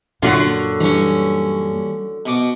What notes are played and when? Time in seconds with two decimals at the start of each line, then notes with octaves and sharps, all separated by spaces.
0.22 F#2 A#2 D3 F#3 F4 F#4
0.80 G2 E3 C#4
2.26 B2 D6